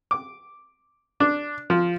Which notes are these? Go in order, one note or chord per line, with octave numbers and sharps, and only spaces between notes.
D6
D4
F3